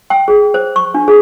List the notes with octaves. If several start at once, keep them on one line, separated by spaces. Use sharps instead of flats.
G5
G#4
C5
C#6
D4
G#4